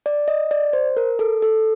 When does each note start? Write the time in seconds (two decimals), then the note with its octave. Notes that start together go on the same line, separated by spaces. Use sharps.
0.06 D5
0.28 D#5
0.51 D5
0.73 C5
0.97 A#4
1.19 A4
1.42 A4